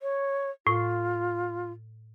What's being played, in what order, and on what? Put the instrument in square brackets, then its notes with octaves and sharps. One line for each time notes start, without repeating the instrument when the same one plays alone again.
[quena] C#5
[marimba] A2 [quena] F4